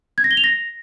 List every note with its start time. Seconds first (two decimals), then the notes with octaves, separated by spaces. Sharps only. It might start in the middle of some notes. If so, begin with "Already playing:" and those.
0.18 G#6
0.24 A#6
0.31 G7
0.37 F7
0.44 A#6